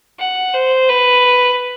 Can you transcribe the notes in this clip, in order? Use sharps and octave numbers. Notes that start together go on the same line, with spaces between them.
F#5
C5
B4